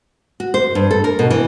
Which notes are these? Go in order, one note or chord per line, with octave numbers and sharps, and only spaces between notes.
F#4
C5
G2
A4
A#4
B2
E3